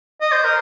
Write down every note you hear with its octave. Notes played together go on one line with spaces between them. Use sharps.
D#5
C5
A#4